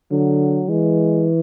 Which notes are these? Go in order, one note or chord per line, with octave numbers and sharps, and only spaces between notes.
D3 F#3
E3 G#3